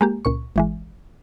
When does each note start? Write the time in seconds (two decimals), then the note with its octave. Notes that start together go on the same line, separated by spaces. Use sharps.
0.01 G#3 A#3 G4
0.25 C#2 A#2 C#6
0.56 G#1 E3 G#3